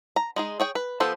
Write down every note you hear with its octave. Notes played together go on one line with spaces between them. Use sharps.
A#5
G#3 D#4 G#4
G#4 C#5 G5
B4
F3 B3 G4 A4 C5